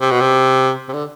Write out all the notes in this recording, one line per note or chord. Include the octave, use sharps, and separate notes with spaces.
C3
B2
C3
C3
D3